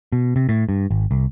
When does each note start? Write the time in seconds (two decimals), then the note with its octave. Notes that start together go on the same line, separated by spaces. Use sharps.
0.12 B2
0.36 C3
0.49 A2
0.69 G2
0.91 G#1
1.11 C2